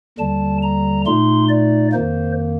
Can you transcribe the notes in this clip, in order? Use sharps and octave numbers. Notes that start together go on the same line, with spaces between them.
D#2 D3 G3 A5
A#5
A#2 A3 D#4 C6
D5
F2 D#3 A#3 C5